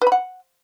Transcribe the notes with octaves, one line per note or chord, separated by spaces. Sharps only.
B4
B5
F#5